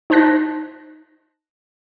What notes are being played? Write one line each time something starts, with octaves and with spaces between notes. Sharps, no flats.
D#4 C5 A5 F#6 A#6